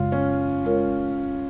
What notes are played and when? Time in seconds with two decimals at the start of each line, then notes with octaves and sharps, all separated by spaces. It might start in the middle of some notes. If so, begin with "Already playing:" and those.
Already playing: F#2 C#3 G#3 F4
0.12 C#4
0.65 G#3 C#4 F4 A#4 C#5